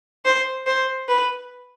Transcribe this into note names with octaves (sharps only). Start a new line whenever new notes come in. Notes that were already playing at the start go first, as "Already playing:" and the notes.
C5
C5
B4